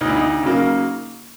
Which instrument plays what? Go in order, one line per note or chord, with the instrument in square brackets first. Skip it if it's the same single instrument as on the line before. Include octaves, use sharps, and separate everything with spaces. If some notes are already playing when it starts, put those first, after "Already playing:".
[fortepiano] D2 D#4
E4
D#4
C#3 F#3 A#3